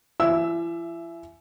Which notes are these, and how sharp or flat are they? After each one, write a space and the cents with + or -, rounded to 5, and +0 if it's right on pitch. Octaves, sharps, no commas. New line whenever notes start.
E3 +40 E5 +20 E6 +0